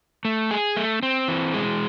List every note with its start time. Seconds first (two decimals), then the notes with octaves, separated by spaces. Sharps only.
0.25 A3
0.51 G#4
0.77 A3
1.03 C4
1.28 E3
1.54 G#3